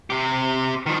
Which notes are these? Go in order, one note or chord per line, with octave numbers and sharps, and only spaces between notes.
C3 G4
D#3 F3